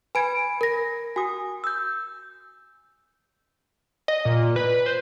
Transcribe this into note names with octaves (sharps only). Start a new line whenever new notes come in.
B4 G#5 B5 G#6 D7
A#4 A#6
F#4 G#5 D#6
E6 G6
D#5
A#2
B4
C5